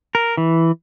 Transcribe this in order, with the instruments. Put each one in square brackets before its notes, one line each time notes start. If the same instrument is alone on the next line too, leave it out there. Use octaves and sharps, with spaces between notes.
[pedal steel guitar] A#4
E3